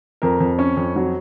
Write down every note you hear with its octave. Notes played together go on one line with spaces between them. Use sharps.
F2 A#4
F2
C#4 C#5
F2
F#3